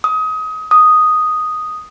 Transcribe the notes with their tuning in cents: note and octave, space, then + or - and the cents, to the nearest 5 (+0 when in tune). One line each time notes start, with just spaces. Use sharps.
D#6 +25
D#6 +0